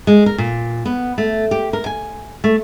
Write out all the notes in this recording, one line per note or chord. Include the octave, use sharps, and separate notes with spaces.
G#3
A#4
A#2
B3
A3
G4
A#4
G#5
A3